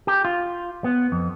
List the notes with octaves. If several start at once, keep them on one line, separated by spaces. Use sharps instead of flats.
G4
F4
B3
F2